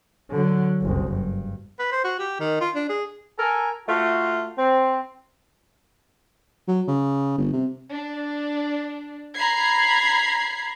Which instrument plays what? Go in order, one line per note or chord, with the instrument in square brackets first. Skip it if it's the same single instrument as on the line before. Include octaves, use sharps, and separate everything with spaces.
[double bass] D3 F#3
F#1 C2
G2
[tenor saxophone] B4
C5
F#4
G4
D#3
F4
D4
G#4
[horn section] A4 A#4 G#5
A3 F4 F#4
C4
[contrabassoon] F#3
C#3
G1
C3
[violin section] D4
A#5 B5 G#6 C7